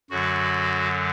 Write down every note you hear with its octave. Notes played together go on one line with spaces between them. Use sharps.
F#2 D3 F#3 F#4